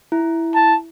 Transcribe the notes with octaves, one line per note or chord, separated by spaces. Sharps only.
E4
A5